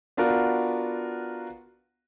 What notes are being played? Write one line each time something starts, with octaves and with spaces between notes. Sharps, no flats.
B3 D4 F4 F#4 A#4